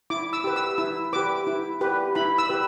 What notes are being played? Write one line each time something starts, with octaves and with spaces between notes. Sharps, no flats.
E4 D6
E6
G4 B4
E6
E4 E6
G4 B4 D6
E4
G4 B4
E4 B5
E6
G4 B4